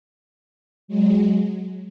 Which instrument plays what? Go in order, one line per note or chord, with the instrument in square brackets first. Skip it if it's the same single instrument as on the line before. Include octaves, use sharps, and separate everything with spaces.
[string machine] F#3 G#3